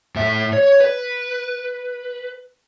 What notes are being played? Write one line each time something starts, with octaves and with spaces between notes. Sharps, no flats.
A2 E5
C#5
B4